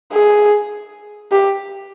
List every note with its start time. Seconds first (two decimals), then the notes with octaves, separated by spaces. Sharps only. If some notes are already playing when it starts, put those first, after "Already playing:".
0.13 G#4
1.32 G4